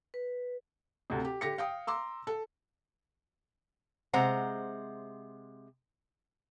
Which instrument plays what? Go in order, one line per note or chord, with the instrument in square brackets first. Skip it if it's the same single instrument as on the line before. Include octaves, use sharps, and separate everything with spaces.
[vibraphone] B4
[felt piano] D2 C3
G4
D3 G4 A#6 C#7
F5 G5 D#6
A#5 C6 D6 E6
A4
[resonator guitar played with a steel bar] C3 G#3 C5 F#5 A#5